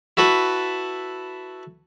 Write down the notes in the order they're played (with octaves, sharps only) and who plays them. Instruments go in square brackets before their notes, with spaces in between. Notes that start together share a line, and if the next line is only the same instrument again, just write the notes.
[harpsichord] E4 F#4 A4 B4